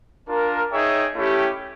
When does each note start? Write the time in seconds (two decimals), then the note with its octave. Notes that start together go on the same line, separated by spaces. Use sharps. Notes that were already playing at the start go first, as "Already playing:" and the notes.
0.27 D4 F4 A#4
0.71 D#4 G#4 C#5 E5 G5
1.14 A3 C#4 E4 G4